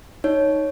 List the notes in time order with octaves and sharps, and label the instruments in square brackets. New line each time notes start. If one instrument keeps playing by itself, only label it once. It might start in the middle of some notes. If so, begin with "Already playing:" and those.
[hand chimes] D#4 C#5